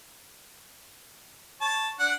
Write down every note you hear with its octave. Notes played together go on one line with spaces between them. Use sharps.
C#5 A5
D4 F#5